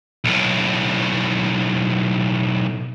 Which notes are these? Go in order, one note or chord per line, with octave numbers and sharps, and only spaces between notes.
B1 A2